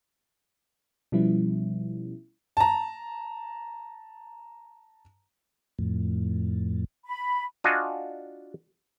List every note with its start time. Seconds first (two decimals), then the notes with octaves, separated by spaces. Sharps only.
1.12 B2 F3 G3 B3 C#4 E4
2.57 A5 A#5
5.79 F2 A2
7.06 B5
7.64 D4 F4 F#4 D#5 G#5